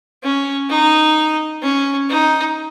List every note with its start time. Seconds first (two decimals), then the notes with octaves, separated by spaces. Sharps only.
0.23 C#4
0.69 D#4
1.63 C#4
2.09 D#4